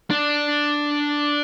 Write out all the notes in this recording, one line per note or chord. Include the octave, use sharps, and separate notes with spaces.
D4